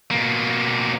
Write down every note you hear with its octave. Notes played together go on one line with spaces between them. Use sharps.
B2 A#3